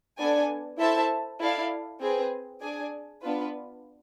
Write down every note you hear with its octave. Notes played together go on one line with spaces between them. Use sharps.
B3 D4 A4 D5 G#5
E4 A4 C5 E5 A5
E4 A4 D5 F5
C4 G#4 B4
D4 G#4 D5 G#5
B3 D4 F4 B4